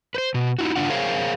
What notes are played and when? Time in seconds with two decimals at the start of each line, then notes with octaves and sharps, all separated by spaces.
0.15 B4 C5
0.34 B2
0.59 D#4 E4 F#4
0.76 C#3 D4 F4 F#5
0.89 G#4 A#4 C5 C#5 F5